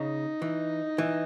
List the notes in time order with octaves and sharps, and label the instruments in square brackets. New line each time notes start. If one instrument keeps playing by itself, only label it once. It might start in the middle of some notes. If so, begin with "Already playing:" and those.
Already playing: [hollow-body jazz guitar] C#3 [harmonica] D#4
[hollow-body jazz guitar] E3
E3